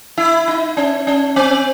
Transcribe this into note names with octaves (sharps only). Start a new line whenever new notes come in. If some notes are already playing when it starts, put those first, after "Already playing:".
E4
D#4
C#4
C#4
C4